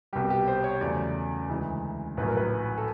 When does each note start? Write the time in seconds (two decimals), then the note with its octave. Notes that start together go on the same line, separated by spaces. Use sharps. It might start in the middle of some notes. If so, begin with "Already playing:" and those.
0.13 C2 B2 G3 G4
0.30 G4
0.48 C5
0.64 C#5
0.81 E2 C#3 F#3 A3 D5
1.49 D2 C#3 E3 G#3
2.17 A#1 A2 F#3 B4
2.28 A#4
2.37 B4
2.78 A4